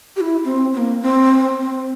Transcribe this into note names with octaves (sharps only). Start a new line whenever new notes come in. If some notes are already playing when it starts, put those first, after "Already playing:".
G4
E4
C4
C4
A#3
C4
C4